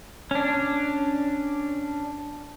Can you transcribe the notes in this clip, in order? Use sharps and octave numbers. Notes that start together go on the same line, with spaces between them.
C#4 D4